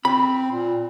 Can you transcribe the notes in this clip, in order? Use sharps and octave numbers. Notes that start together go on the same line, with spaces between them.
C4 B5
A#2